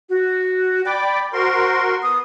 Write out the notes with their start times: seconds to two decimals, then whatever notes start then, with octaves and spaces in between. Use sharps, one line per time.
0.09 F#4
0.86 D5 G5 B5 D6
1.33 F#4 A#4 C5 C6
2.02 B3 D#6